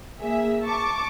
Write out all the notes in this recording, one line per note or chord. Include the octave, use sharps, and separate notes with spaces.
A#3 G#4 E5
A5 C#6 D6